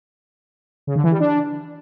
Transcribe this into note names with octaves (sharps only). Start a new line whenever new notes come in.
C#3
D3
E3
G3
D4